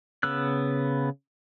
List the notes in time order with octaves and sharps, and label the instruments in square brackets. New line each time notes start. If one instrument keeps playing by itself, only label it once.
[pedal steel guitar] C#3 B3 E6 F#6